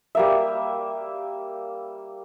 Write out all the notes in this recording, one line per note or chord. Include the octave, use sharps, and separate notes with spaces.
G3 A#3 E5